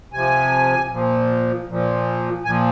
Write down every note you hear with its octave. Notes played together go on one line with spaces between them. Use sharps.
C3 F3 G#5
A#2 F3
A#2 F3
A#2 F3 G#5